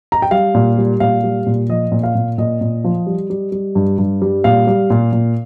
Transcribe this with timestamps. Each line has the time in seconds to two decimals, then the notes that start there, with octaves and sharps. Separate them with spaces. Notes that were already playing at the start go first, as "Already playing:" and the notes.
0.12 A#5
0.22 G5
0.31 G3 F5
0.55 A#2
0.78 G3
1.00 A#2 F5
1.24 G3
1.46 A#2
1.69 F3 D#5
1.92 A#2
2.03 F5
2.15 A#2
2.38 A#2 D#5
2.61 A#2
2.84 F3
3.07 G3
3.30 G3
3.52 G3
3.75 G2
3.98 G2
4.22 G3
4.44 A#2 F5
4.67 G3
4.90 A#2
5.13 A#2